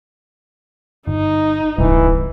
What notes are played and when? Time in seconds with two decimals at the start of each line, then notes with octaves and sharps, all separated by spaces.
1.07 G1 D#4
1.79 D1 G1 C2 E3